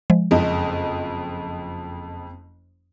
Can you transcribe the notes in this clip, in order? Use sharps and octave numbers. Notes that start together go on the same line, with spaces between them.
F3 G#3
F#1 F2 D#5